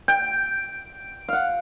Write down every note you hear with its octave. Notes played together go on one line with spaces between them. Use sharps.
G5
F5 F#5